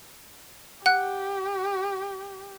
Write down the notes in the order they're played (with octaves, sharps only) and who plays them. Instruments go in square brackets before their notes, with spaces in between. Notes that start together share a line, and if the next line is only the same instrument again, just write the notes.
[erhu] G4 [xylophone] F#5 F#6